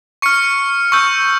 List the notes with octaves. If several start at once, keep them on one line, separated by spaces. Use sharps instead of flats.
C#6 F6 C#7
C#6 E6 G6